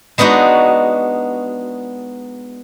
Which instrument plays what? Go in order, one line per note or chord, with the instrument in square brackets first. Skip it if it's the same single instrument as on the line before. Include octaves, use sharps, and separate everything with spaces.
[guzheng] G#3 B3 D4 D#4 F#4